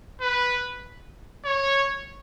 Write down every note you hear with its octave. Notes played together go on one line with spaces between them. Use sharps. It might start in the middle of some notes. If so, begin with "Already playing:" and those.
B4
C#5